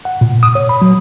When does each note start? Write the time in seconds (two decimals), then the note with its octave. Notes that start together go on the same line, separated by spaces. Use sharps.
0.05 F#5
0.21 A#2
0.43 D#6
0.55 C#5
0.69 B5
0.82 F#3